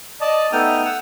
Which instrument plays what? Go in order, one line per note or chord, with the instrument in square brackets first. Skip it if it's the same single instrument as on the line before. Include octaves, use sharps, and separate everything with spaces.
[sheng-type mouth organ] D5 D#5 A5
A3 B3 D#4 G5 D#6 F6
F#5 E6